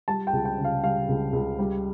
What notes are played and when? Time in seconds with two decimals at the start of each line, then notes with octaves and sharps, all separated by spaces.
0.08 G3 A5
0.27 G5
0.33 C#2
0.45 G5
0.58 C#3
0.65 F5
0.83 G3 F5
1.09 C#2
1.33 C#2
1.59 G3